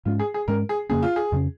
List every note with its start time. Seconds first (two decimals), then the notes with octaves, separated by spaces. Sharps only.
0.05 G#2 G#3 C#4 F4
0.19 G#4
0.34 G#4
0.48 G#2 G#3 C#4 A#4
0.69 G#4
0.89 F2 C#3 A#3 C#4 G#4
1.03 F4
1.16 G#4
1.32 F2 C#3 A#3 C#4